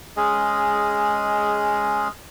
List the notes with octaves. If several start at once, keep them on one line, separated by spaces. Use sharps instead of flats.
G#3 C#4 G#4 D#5